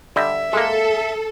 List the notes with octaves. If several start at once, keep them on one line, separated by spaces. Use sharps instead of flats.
D3 G3 D#5 E5
G#3 A#3 A4